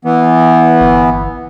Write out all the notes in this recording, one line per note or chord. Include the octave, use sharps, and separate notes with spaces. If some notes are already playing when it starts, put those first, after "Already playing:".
E3 B3
G1